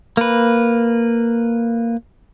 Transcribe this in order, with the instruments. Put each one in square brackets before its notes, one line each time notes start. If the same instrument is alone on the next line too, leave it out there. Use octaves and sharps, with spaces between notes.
[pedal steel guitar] A#3 B4